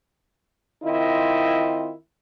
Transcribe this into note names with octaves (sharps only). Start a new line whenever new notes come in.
D#3 C4 E4 F4 D#5